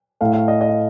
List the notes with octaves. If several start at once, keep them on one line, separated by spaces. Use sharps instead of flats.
A2 A3 F5
F5
D#5
D#5
F5